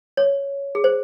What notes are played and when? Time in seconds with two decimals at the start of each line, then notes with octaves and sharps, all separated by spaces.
0.17 C#5
0.75 G#4
0.84 C5